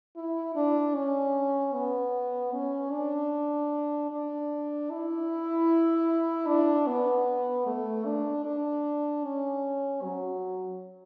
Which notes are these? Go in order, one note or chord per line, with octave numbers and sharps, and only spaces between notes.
E4
D4
C#4
B3
C#4
D4
D4
E4
D4
B3
A3
D4
D4
C#4
F#3